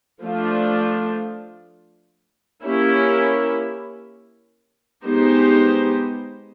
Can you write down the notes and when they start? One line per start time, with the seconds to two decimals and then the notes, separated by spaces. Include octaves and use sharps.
0.22 F3 A3 D4 F4
2.64 A#3 C#4 E4 G4
5.05 G#3 B3 D#4 G4 C5